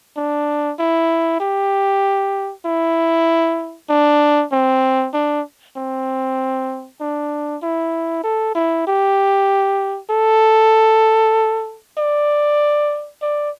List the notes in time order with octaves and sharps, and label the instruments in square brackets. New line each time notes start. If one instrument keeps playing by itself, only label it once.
[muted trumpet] D4
E4
G4
E4
D4
C4
D4
C4
D4
E4
A4
E4
G4
A4
D5
D5